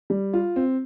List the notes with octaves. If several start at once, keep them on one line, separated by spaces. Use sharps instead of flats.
G3
F4
C4